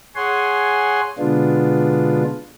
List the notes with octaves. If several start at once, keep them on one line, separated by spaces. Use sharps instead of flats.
G#4 C#5 F#5 G#5 C6
B2 D3 G#3 B3 D4 F4